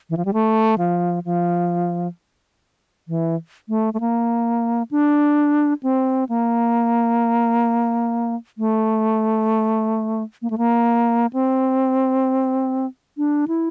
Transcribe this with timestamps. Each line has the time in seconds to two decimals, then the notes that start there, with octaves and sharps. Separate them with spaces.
0.10 E3
0.17 F3
0.25 G3
0.33 A3
0.78 F3
1.25 F3
3.08 E3
3.69 A3
3.94 A3
4.00 A#3
4.91 D4
5.83 C4
6.29 A#3
8.58 A3
10.42 A#3
10.50 A3
10.58 A#3
11.33 C4
13.18 D4
13.48 E4